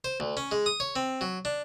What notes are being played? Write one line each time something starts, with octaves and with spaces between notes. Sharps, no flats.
C5
D2
C#4
G#3
D#6
C#5
C4
F#3
D4